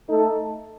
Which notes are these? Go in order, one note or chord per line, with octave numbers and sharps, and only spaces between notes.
A3 D#4 A4